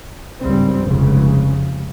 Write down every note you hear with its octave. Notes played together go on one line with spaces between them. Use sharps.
G#1 C#2 G2 G3 C4
F1 C#2 C#3